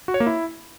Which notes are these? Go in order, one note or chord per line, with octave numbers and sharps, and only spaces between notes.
F#4
C#5
A#3
E4